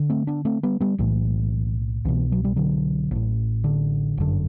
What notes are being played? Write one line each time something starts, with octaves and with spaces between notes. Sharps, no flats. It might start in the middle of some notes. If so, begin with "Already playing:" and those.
Already playing: D3
A3 C4
B3 D4
A3 C4
G3 B3
G3 B3
B1 A2 E3
C2 B2 E3
F#3
G3
D3 F#3
A1 A2
D3
G1 F#2 D3